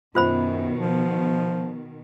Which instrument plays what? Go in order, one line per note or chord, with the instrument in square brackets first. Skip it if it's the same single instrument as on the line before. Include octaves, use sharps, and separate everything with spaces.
[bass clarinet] F#2 [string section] B2 D#3 [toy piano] F4 C5 B5
[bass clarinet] F3